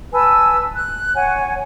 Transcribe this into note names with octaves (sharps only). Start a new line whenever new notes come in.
B4 G#5 A5 E6
F#6
C#5 F#5 G#5